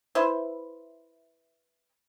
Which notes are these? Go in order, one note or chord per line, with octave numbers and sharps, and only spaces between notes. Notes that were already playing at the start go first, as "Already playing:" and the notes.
E4 B4 C5